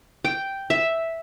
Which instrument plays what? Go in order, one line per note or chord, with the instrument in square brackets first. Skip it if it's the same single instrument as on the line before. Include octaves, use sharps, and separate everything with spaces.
[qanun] G5
E5